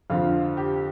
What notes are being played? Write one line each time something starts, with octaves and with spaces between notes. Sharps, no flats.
F2 D3 F3 F4
G4